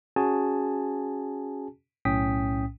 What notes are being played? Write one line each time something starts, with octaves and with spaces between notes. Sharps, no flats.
C#4 F#4 G#4 G#5 A5
B1 A2 C#4 G5 D#6 B6